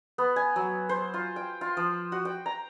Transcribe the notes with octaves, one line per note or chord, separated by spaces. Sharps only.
B3
G#5
F#3
C5
F4
G5
F4
F3
F#4
G5
A#5